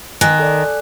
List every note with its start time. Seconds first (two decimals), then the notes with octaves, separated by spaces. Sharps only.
0.21 D#3 G#5 F#6
0.39 A4 D5